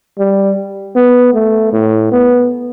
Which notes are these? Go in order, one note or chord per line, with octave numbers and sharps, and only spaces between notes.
G3
B3
A3
A2
B3